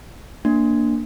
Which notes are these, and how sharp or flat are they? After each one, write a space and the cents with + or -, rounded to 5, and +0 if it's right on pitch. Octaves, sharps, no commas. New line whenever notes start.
A#3 +0 D4 -5